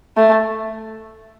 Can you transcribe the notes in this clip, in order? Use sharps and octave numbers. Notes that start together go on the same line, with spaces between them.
A3